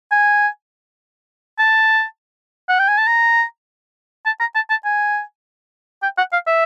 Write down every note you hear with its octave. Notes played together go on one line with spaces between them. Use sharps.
G#5
A5
F#5
G5
G#5
A5
A#5
A5
A#5
A5
A5
G#5
G5
F#5
F5
E5